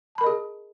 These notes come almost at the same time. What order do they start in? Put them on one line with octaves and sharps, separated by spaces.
A5 B5 A#4 D#5 G#4